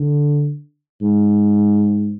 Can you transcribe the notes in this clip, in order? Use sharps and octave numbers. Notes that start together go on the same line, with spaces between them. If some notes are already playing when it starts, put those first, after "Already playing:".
Already playing: D3
G#2